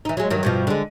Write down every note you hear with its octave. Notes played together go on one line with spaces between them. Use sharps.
E3 D#4
F#3 G#3
G2 D#3 F#3
G2 B2 F3
D3 G#3